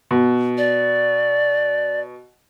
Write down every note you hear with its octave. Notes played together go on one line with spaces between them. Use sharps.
B2
D5